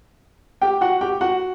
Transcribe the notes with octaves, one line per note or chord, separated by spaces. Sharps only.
G4 G5
F#4 F#5
G4 G5
F#4 F#5